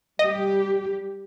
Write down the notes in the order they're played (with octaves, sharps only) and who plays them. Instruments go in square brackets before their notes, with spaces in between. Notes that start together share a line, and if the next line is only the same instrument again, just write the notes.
[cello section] G3 G4 [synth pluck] D#5